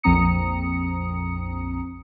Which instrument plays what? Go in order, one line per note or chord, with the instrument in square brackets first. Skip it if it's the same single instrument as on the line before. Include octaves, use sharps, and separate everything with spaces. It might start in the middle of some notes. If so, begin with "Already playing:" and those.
[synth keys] A#1 F2 C4 A#5 D#6 C#7